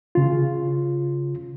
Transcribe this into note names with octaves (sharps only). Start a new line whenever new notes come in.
C#3 F4